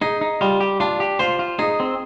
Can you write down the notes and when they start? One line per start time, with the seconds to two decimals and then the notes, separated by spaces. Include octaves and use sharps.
0.02 D#4 G#4
0.21 D#4
0.41 G3 F4
0.60 G4
0.80 D4 F4
1.00 G4
1.19 F4 C5
1.39 F4
1.59 D#4 G#4
1.80 C4